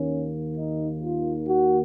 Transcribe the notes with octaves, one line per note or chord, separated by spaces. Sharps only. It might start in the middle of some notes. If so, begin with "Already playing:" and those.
Already playing: D#2 D#3 A#3 C#4
D#4
F4
F#4